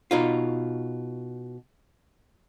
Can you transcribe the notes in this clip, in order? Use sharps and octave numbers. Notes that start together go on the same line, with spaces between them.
B2 D#4 F4